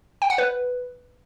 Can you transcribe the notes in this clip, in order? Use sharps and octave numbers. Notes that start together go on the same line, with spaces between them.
G5
F#5
B4